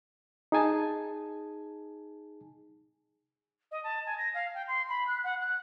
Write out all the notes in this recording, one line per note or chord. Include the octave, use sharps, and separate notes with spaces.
D#4 G#4 G#5 A5
D#5
A5
G#5
A#6
F5
G5
C6
B5
F#6
F#5
F#6